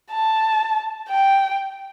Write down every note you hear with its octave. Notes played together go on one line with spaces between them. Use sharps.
A5
G5